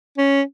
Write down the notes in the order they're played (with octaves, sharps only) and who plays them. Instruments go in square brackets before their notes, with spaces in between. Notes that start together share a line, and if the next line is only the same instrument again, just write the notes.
[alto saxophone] C#4